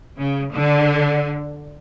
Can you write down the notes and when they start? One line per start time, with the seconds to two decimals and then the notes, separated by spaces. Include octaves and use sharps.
0.17 C#3
0.52 D3